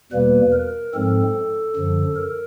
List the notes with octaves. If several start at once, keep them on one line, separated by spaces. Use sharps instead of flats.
E2 B2 G3 A#3 B4
A#4
G#2 F3 G#3 C4 A4
F#2 D3 F3
A#4